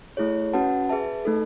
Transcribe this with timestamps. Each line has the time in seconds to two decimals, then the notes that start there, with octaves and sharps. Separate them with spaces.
0.17 A3 E4 G#4 C#5
0.53 C#4 F#4 B4 F#5 A5
0.89 G#4 B4 E5 A5
1.25 A3 D#4 A4